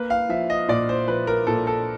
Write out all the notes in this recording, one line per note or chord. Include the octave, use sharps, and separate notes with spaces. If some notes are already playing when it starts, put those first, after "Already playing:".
Already playing: A#3 B4
F5
F3 E5
D#5
A#2 D5
C5
F3 B4
A#4
A#2 A4
A4